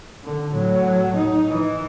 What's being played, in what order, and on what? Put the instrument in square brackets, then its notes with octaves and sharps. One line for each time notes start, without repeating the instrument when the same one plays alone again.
[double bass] D3
A2 F#3
D#4
E3